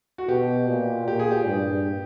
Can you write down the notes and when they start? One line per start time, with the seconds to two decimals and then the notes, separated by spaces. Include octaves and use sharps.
0.18 F#4
0.29 B2 G4
0.68 A#2
1.08 A#2 G4
1.19 G#4
1.31 G4
1.47 G2